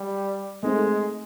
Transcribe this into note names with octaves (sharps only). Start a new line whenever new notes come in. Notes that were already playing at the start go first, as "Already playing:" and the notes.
Already playing: G3
G#3 A3 C4 D#4 G#4 C5